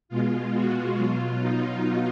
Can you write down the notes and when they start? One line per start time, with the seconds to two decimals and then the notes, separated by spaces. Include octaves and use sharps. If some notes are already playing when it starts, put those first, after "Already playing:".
0.09 B2 G#3 F4
0.53 F#4
0.95 B2 F#3 F4
1.39 D#4